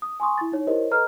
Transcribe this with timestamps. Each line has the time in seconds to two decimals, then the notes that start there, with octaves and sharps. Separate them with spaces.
0.02 D#6
0.20 G#5 C6 C#6 D#6
0.38 E4 A6
0.52 D#4 C#5
0.67 E4 G4 A#4 C5 C#5 D#5
0.91 A4 B4 D#5 A#5 F6